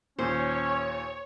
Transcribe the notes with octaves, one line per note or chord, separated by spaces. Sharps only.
D#2 A#2 C#4 C5 C#5